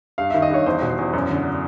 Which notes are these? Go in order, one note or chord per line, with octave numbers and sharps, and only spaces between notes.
G2 F5
D#3 E5
D#5
G2 C#5
E2 C5
B2
C5
E2
F#2
D3